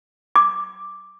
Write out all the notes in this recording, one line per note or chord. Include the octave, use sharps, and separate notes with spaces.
D6